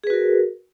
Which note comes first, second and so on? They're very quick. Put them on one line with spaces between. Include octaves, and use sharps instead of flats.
G#4 B4 F#4 A#4